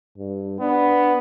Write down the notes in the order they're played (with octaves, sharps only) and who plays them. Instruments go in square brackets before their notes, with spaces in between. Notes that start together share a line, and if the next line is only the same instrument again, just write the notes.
[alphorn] G2
[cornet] B3 [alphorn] D4